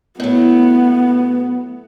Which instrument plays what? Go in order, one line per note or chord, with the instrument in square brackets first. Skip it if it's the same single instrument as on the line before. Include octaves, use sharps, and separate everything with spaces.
[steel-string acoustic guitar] A2 F#3 [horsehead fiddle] B3